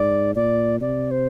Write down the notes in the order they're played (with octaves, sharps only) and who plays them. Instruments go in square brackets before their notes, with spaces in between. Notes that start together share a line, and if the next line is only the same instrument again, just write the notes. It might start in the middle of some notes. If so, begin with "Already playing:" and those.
Already playing: [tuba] G#2 [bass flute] D5
[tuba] A#2 [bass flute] D5
[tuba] C3 [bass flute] D5
[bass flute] C5